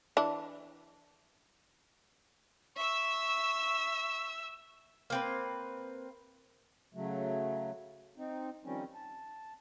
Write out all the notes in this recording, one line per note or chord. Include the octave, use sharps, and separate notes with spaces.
E3 D4
E5 C#6 E6
A#3 C4 B4
C#3 F#3 A3
C4 D#4
D#3 F3 G3 C4 C#4
A5